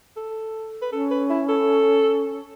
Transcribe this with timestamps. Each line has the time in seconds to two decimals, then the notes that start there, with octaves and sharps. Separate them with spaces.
0.16 A4
0.82 B4
0.92 C#4 A4
1.11 B4
1.30 E4
1.48 A4